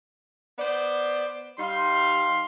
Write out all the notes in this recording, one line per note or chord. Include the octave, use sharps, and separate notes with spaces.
B3 C5 D5
G3 D#4 F5 C6